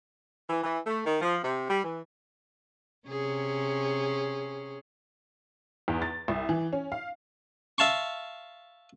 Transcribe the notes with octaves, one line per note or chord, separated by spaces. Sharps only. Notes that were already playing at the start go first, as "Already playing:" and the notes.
E3
E3
A3
D#3
F3
C3
G3
E3
C3 C#4 G#4
E2
A6
C2
E3
C#4
F5
E5 F5 A5 C6 C#6